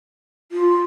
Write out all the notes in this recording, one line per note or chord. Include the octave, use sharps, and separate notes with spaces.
F4